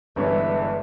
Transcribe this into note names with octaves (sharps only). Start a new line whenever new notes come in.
G1 G2 E3 G#3 B4 C#5